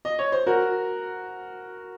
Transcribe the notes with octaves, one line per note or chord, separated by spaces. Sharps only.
D#5
C#5
C5
F#4 A#4